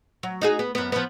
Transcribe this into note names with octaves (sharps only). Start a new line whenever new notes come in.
F#3
D#4 F#4 G#4
B3
F#2 B3
F3 B3